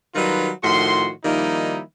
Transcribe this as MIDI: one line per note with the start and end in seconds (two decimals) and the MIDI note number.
0.15 0.51 51
0.15 0.51 54
0.15 0.51 55
0.15 0.51 63
0.15 0.51 65
0.15 0.51 71
0.63 1.10 45
0.63 1.10 51
0.63 1.10 53
0.63 1.10 66
0.63 1.10 84
1.24 1.80 51
1.24 1.80 53
1.24 1.80 55
1.24 1.80 58
1.24 1.80 63
1.24 1.80 64